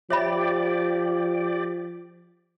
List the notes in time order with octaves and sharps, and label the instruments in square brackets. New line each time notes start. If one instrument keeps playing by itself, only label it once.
[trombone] F3 [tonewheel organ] G4 D5 [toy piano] C#5 E5 B5